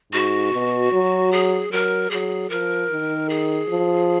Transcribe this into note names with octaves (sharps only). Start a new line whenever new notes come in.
G#2 F#4
B2
F#3
G#4
F#3 A#4
F#3 G#4
F3 A#4
D#3
G#4
F3